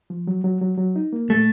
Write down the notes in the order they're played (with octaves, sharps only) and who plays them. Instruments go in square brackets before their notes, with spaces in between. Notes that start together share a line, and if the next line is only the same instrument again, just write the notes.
[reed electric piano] F3
F#3
F#3
F#3
F#3
D#4
A#3
[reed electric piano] A#2 [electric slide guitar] A3